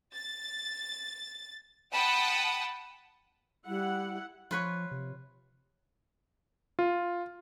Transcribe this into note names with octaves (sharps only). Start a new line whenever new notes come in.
A6
F#5 G5 A5 B5 D#6
G3 E4 F#5
F3 F4 B4 C#5
C3
F4